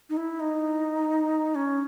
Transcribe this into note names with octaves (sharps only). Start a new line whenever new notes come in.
D#4
E4
D#4
C#4